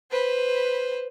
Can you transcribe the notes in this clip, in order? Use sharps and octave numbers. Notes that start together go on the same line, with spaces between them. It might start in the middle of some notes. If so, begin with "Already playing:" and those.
B4 C5